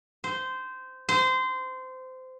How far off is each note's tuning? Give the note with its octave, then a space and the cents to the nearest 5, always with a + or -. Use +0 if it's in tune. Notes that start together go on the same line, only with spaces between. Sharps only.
C5 -15
C5 -20